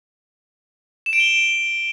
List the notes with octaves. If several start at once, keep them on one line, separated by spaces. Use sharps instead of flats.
E7
D7
G7